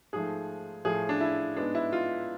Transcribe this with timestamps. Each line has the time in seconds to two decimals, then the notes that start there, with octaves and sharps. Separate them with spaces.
0.13 G#2 F3 A3 G#4
0.85 A2 F3 A3 G#4
1.09 D4
1.21 E4
1.56 G#2 G#3 B3 D4
1.75 E4
1.92 F4